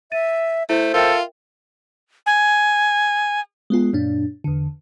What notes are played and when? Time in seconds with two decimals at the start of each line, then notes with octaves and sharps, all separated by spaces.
0.12 E5 A6 D#7
0.69 A3 E4 C5
0.94 F4 A4 A#4 E5 G5
2.26 G#5
3.70 G#3 B3 F4
3.93 F#2 A#2 D4
4.44 E2 D3